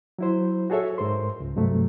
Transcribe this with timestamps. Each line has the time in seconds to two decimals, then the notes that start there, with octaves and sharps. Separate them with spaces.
0.19 F#3 E4 C5
0.70 F#4 G#4 A4 C#5 E5
0.98 G#2 A#4 C5 C6
1.40 C#2
1.56 G2 C3 F#3 A3